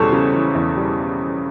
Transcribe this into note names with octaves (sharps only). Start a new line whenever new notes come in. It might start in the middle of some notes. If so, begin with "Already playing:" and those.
Already playing: E2 C#3 E3 G3 A4 C5 C#5
C#3
E3
E2
G3